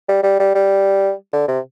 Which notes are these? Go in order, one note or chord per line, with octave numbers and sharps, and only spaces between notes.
G3
G3
G3
G3
D3
C3